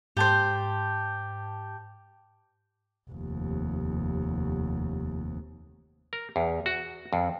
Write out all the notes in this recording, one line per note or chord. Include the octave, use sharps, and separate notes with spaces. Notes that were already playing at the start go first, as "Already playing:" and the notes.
G#2 G4 C5 A5 G6
F1 D#2
A#4
E2
F#4
F2